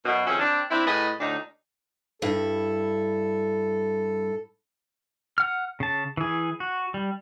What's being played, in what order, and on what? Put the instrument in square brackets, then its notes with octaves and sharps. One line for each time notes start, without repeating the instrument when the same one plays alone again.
[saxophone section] F#2 B2
F2 D#3 C#4 G#4 E5
C4 D4
C4 D4 E4
A2 G#4 B4 D#5
D2 A2 D4 D#4
[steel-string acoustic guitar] G2 E4 [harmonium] A4
[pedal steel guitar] F#5 F6
C#3 A5
E3 G#4
F#4
G3